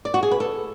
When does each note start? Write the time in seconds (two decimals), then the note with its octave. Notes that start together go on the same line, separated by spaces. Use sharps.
0.05 D5
0.14 F#4
0.23 G#4
0.31 B4
0.40 A4